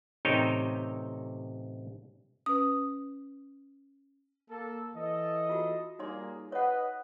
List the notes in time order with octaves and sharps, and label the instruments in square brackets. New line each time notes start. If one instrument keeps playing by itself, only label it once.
[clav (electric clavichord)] A1 C3 D#4 C#5 G5
[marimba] C#4 B4 [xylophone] D#6
[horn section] A#3 A4
E3 A4 D#5
[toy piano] F4 F#4
[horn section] G3 A#3 G#4 [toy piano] D#4 C#5 C6
[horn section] B4 D#5 [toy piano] C#5 F#5